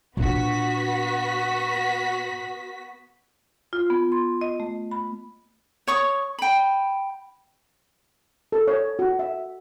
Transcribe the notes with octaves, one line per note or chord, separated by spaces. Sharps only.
A#2 B3 D4 F#4 B6
F4
B3
C6
D#5
A3
B5
C#5 C#6 D#6
G5 B5
A4
C#5
F#4
E5